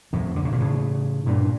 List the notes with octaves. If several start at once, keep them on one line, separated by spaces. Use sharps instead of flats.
F2 A2
D3
C#3
A#2
A2 C#3
G2 A#2